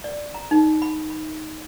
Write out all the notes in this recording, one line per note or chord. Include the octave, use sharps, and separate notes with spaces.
D5
A#5
D#4
B5
B5